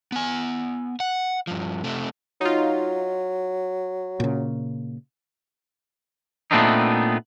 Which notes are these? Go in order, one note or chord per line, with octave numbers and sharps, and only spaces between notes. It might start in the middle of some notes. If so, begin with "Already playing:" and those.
B3 G#5
F#5
G2 F3
C3 A3
F#3 D#4 F4
A#2 C#3
A#2 A3 B3 C4 D4 D#4